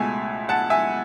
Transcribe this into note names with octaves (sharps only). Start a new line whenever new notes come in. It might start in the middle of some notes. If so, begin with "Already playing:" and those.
Already playing: C#2 B2 A3 E5 G#5
F#5 A5
E5 G#5